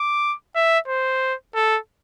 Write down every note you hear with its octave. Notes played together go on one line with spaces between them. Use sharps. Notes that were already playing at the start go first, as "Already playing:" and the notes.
Already playing: D6
E5
C5
A4